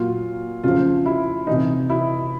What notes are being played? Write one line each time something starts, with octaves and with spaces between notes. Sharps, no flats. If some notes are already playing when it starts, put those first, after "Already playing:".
Already playing: A#2 F#3 F4
C#3 F3 F4
E4
C3 E3 D#4
E4